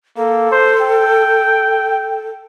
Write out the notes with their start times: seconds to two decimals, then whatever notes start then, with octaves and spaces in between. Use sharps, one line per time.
0.17 A#3 A4
0.52 C5
0.82 G5